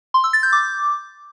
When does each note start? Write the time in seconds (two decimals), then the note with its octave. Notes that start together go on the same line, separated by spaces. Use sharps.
0.14 C6
0.24 E6
0.33 A6
0.43 G6
0.53 D6